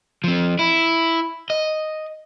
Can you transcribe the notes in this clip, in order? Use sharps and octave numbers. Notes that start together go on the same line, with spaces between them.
F3 C4
E4
D#5